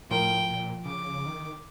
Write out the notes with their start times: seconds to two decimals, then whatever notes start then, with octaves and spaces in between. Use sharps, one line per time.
0.11 A2 F3 A#4 G5
0.50 A#2
0.85 C#3 D6
1.26 D#3